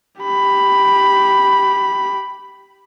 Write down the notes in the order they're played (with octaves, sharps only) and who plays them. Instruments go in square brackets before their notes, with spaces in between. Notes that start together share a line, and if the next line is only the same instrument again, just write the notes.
[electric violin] G4 B5